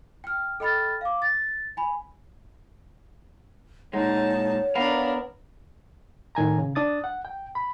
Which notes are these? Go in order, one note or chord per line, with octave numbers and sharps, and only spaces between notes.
G5 F6
A4 D#5 G5 B5 F6 A6
F5 D6
A6
G#5 B5
A#2 G#3 D#4 C#5 F#5 A5
B3 D4 A#4 B4 F5 A#5
A2 D#3 G#5 A#5
C#3
D4 D#6 A6
F#5
G5
B5